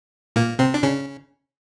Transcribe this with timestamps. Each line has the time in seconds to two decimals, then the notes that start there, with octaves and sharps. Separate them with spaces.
0.36 A#2 A#3
0.59 C3 C4
0.74 D4
0.83 C#3 C#4